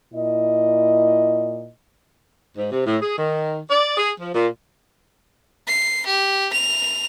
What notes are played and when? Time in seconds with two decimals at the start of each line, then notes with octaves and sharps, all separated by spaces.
0.14 A#2 E4 D#5
2.58 G#2
2.72 C3
2.86 A2
3.02 G#4
3.18 D#3
3.70 D5
3.97 G#4
4.21 F3
4.35 A#2
5.67 C7
6.07 G4
6.53 F7